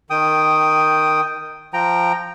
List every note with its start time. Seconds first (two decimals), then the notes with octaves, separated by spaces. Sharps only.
0.10 D#3 G5 D#6
1.74 F3 G5 A#5